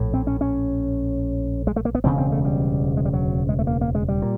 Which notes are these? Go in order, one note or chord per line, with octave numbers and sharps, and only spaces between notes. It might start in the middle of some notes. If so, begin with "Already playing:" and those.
Already playing: A#1 A2
C4
C#4
C#4
G#3
A3
A#3
B3
E1 D2 C#3 C4
C4
A3
G3
G#3
G3
F#3
G#3
A3
A#3
A#3
G#3
G3
A#2